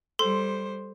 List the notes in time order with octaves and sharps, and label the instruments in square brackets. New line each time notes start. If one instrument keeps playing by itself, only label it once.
[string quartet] G3 C5 [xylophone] A4 C6